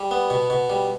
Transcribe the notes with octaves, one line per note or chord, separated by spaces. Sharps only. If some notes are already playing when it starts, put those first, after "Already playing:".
Already playing: G3
B3
B2
B2
G3